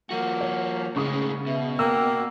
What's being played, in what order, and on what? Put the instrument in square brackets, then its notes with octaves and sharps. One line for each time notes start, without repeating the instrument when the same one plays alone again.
[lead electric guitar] F3 F#4 [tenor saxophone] A#3
[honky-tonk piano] C#5
[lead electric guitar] A2 G#3 [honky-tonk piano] C#3 C#6 D#6
[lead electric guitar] B2 [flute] E5
[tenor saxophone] A#3 [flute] G5 [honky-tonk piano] E6 F#6